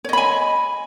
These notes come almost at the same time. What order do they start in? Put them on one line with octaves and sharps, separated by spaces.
C#5 D#5 B5 G#5